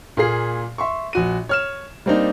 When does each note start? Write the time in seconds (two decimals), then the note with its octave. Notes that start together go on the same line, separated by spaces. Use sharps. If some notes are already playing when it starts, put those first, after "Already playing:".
0.17 A#2 A#3 G#4 C7
0.78 E5 C6 C#6
1.13 A#1 F#4 D#7
1.49 C#5 F6 E7
2.06 G3 A#3 C4 D4 D#4